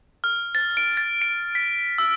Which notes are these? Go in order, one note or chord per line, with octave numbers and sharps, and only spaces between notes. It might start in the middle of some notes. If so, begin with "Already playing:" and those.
F6
A6
D7
A6
D7
B6
E6